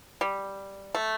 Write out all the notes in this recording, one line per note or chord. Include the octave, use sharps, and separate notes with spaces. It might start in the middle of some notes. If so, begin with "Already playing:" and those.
G3
A3